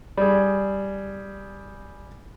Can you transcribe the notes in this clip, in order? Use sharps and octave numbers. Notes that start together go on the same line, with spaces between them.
G3 G#4